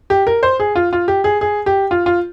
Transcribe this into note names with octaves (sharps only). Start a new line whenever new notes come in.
G4
A#4
C5
G#4
F4
F4
G4
G#4
G#4
G4
F4
F4